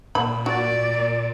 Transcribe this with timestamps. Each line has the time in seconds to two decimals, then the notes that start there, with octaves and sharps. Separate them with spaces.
0.15 A#2 B5
0.46 F#4 D5